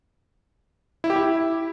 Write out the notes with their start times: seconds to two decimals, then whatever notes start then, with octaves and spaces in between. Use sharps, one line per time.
1.04 E4
1.10 G4
1.16 E4